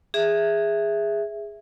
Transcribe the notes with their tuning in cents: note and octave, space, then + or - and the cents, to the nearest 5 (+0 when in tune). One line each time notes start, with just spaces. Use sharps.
G#4 -10 E5 +0